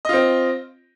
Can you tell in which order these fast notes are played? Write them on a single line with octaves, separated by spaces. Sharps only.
D#5 F4 C4